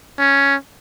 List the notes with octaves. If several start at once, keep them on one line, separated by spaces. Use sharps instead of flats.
C#4